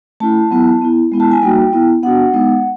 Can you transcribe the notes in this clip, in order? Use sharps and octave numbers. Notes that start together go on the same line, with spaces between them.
A3 C#4 E4 A5
F#3 B3 E4
B3 E4
G#3 B3 E4
A5
G#5
G3 A#3 D#4 F#4 G5
B3 E4
B3 D4 F#4 F#5
G#3 B3 D#4